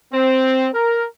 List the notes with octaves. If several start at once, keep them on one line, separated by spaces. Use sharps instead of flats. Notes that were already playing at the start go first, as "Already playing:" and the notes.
C4
A#4